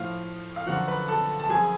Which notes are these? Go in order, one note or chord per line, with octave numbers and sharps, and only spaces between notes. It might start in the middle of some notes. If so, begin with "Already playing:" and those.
Already playing: A2 F3 F5
F5
F#2 D3 F3 F#4 F#5
B4 B5
A4 A5
A5
F#2 F3 G#4 G#5